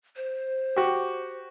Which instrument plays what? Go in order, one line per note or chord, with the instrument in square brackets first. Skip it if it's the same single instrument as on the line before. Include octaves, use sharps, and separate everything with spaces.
[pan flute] C5
[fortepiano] F#4 G4